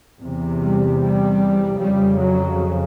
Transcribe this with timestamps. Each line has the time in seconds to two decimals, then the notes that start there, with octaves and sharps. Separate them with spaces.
0.19 E2 C3
0.59 G3
0.99 G3
1.77 F2 C#3 G3
2.17 F#3